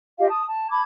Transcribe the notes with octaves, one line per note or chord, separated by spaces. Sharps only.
F4 G4 D#5 F5
A5 D#6
A5
A5 B5 D6 G#6